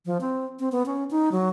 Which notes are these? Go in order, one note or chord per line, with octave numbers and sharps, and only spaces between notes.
F3
C4
C4
B3
C#4
D#4
F#3